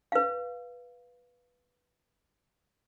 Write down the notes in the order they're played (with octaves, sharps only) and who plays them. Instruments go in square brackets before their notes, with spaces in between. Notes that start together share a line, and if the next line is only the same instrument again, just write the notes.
[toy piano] B4 F5